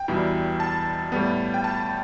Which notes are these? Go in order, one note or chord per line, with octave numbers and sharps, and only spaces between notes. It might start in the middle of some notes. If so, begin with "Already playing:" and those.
Already playing: G5
E2 B2 G3 E4
A5
A2 G3 B3
G5
A5